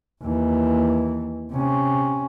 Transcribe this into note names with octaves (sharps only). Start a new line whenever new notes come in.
D#2 E3
C3 C#4